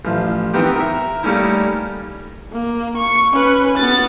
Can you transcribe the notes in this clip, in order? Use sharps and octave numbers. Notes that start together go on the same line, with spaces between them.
A1 F3
D#3 E3 B3 C4 D#4 G4
A#4 E5
G3 A3 A#3 C#4 D#4 E4
A#3
C#6
C#4 B4
B3 A6